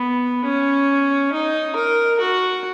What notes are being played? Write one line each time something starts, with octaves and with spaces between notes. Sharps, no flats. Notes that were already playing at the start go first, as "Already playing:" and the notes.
Already playing: B3
C#4
D#4
A#4
F#4